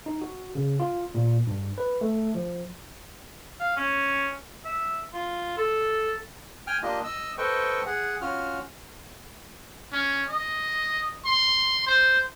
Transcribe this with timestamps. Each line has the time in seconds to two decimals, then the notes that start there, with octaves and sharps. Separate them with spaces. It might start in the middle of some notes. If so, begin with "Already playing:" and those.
0.06 D#4
0.22 F#4
0.55 C#3
0.80 F4
1.15 A#2
1.47 G2
1.78 B4
2.01 A3
2.35 F3
3.60 F5
3.77 C#4
4.65 E5
5.13 F4
5.58 A4
6.67 G5 G#5 F6
6.83 A#3 D4 F4 G4 D#5
7.04 D#5 E6
7.38 A4 B4 C5 D#5 G5 C#6
7.86 G#4 F#5
8.21 C#4 F4 F#4 F6
9.92 C#4
10.29 D#5
11.25 C6
11.86 C5